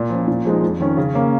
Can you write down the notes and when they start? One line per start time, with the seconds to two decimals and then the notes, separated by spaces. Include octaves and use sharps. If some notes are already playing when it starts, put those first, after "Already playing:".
Already playing: A#2
0.10 F3 C#4
0.28 A#2
0.45 F3 G#3 D#4
0.63 F2
0.80 D#3 C#4
0.97 C#3
1.15 A#3 C#4